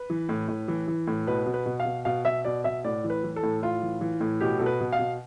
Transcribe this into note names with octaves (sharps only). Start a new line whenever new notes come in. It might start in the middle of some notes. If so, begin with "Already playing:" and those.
Already playing: B4
E3
A2
A2
E3
E3
A2
B2 B4
B2
B4
B2
F5
B2
B2 F5
B2 E5
B2 D5
B2 E5
A2 D5
E3
B4
E3
A4
A2
A2 F4
E3
E3
A2
B2 G4
B2 A4
B4
B2
F5
B2